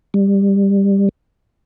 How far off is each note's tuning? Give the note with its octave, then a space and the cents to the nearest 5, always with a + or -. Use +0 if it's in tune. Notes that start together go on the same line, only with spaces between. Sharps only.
G3 +15